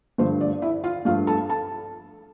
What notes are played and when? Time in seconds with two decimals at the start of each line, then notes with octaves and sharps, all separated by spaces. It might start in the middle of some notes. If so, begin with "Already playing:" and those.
0.18 G2 D3 F3 A3 C5
0.41 D5
0.62 E4 E5
0.84 F4 F5
1.05 G2 F3 A3 F4 F5
1.27 A4 A5
1.49 A4 A5